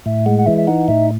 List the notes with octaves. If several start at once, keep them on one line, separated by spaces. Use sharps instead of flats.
A2 E5
G#3 F#5
F#5
E3 E5
E5
D#4 F#5
A2 E5